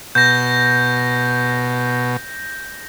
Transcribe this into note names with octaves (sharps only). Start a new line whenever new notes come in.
B2 G6 A#6